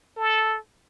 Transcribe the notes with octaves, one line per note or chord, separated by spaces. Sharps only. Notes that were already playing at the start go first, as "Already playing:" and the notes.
A4